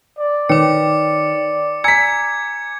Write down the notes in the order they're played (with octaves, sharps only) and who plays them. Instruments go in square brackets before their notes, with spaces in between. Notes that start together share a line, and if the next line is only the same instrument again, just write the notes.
[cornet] D5
[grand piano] D#3 [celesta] B4 C#5 G5 [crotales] D6 C#7
[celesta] G#5 A#5 E6 [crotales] G#6 [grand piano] B6 C#7